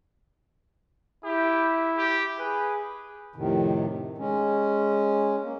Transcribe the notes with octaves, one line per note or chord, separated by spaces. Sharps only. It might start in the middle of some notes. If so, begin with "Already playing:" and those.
E4 G4
G4
G#4 B4
F2 A2 C3 D#3
G#3 C#4
A#3